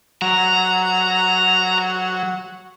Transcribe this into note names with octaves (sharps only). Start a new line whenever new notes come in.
F#3 A#5